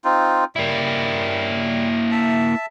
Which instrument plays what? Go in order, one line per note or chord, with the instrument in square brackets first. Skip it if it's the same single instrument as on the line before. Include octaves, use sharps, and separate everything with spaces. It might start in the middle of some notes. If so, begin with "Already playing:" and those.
[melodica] C4 D#4 F4
[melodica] G3 [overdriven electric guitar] A#3 E4
[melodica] E5 A5